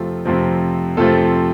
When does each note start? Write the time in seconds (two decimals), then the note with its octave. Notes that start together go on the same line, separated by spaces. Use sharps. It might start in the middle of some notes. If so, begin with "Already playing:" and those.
Already playing: F2 C3 F3 A3 C4 F4 A4
0.25 F2 C3 F3 A3 C4
0.97 F2 C3 F3 A3 C4 F4 A4